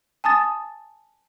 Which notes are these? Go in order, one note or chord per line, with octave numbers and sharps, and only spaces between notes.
G#5 A5 D#6 A6